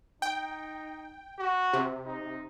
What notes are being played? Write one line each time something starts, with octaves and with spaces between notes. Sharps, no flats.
D#4 G5
F#4
C3
D#4